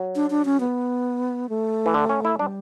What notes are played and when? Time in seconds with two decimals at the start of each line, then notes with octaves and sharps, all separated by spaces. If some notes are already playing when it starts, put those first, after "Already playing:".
Already playing: F#3
0.16 D4
0.30 D4
0.45 C#4
0.60 B3
1.49 A3
1.86 E3
1.94 D3
2.09 C#4
2.25 E4
2.39 G3 D4